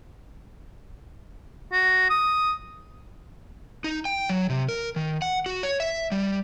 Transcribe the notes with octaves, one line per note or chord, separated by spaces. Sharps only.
F#4
D#6
D#4
G5
F#3
C3
A#4
D#3
F#5
F#4
C#5
E5
G3